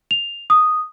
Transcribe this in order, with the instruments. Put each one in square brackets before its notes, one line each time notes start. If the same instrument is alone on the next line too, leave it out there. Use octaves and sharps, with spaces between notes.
[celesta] F7
D#6